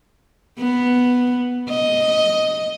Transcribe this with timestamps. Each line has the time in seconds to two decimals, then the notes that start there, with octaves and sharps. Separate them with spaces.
0.59 B3
1.70 D#5